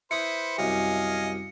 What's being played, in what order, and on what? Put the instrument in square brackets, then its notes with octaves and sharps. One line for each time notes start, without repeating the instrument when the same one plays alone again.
[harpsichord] E4 D#6 [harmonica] B4 C5 [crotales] C#7
[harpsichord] C2 F#2 [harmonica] D#5 F5 G#5